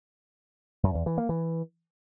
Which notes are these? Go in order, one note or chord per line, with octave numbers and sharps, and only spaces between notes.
F#2
E2
E3
A#3
E3